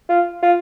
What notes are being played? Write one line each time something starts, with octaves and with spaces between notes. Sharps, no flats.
F4
F4